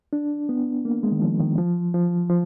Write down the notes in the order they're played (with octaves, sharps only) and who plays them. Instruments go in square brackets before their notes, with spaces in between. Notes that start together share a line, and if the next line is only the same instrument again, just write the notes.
[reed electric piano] D4
B3
A#3
G#3
D#3
F3
D#3
F3
F3
F3